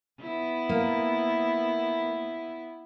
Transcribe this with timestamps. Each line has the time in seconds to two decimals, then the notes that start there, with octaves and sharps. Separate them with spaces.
0.20 B3 E4
0.69 A#3